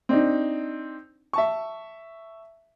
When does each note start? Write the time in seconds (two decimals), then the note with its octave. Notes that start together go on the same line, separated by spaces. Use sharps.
0.09 C4 D4 D#4
1.33 E5 A5 C#6